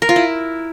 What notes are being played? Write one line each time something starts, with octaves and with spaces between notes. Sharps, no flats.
A#4
F4
E4